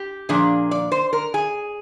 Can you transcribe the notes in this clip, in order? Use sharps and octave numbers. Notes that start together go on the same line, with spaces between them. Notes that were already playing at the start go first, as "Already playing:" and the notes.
Already playing: G4
A#2 F3 A#3 D4 G#4
D5
C5
A#4
G#4